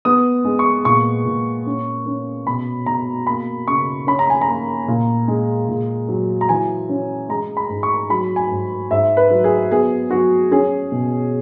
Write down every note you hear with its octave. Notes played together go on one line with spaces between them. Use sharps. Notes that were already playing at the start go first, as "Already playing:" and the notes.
B3 D#6
G#3
C#6
A#2 C#6
A#2
C#4
C#4
B2 B5
B2 A#5
A#3 B5
C#3 C#6
C#4 B5
A#5
G#5
A#5
A#3
A#2
G#3
A#2
F#3
A#5
E3 G#5
C#4
G#3 A#5
B5
G#2
C#6
F#3 B5
G#5
G#2
G#2 E5
B4
F#3
G#4
B3 G#4
F#3 F#4
C#4 G#4
B2